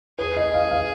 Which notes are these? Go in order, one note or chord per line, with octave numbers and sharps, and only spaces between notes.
G#4 B4
D#5
F5
F5